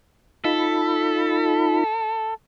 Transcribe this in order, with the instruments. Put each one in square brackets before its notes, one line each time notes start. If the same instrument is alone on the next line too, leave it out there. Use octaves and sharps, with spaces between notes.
[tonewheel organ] D#4 F4 B5 [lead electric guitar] A4